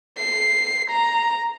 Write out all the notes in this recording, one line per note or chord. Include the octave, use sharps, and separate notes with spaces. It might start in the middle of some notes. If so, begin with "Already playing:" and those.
C7
A#5